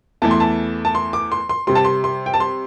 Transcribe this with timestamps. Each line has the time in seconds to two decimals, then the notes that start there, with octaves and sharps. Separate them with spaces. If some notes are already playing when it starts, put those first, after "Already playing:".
0.22 E2 E3 A3 A5
0.31 C6
0.40 A5
0.85 A5
0.95 C6
1.13 D6
1.32 C6
1.49 C6
1.67 C3 G3 C6
1.75 A5
1.85 C6
2.04 C6
2.26 G5
2.34 A5
2.40 C6